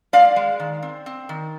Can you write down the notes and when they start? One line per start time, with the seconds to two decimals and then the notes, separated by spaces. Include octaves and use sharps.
0.13 G#3 D5 F5
0.36 G#3
0.60 D#3
0.83 C4
1.06 C4
1.29 D#3